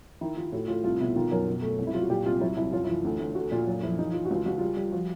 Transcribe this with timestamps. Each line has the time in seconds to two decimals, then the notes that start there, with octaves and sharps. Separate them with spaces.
0.21 D#3 E4
0.37 D#3 F4
0.52 A2 F#4
0.68 A2 F4
0.84 C2 F4
1.00 B2 E4
1.15 D#3 F4
1.31 F#2 A#4
1.47 B2
1.62 A3
1.79 C2
1.87 E4
1.94 F#3 F4
2.02 F#4
2.10 A#2 G4
2.26 C2 F4
2.41 F#3 E4
2.57 C2 E4
2.72 F#2 F4
2.84 E4
2.88 E3 F4
3.04 D2
3.20 D2
3.35 A3 F#4
3.52 A#2 F4
3.67 F#2
3.83 F3 E4
3.98 E3 D#4
4.14 E3 F4
4.25 C#2 F#4
4.36 F4
4.46 C#2 F#4
4.58 G3 F4
4.76 G3
4.92 F3 F#4